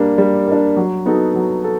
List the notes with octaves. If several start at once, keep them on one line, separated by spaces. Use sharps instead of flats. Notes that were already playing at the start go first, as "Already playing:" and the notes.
Already playing: G3 A#3 D4
G3
A#3 D4
F#3
B3 D#4 F#4 A4
F#3
A4